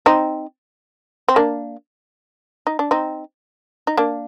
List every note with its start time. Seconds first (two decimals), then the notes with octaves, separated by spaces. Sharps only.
0.06 C4 D#4
1.28 C4
1.36 A#3 D4
2.67 D#4
2.79 D4
2.91 C4 D#4
3.87 D#4
3.97 A#3 D4